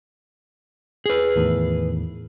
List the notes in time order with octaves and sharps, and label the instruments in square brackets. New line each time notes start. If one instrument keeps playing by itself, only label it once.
[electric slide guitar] G#4 B4
[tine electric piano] E2 A2 D#3